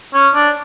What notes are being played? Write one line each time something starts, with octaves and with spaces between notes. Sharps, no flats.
C#4
D4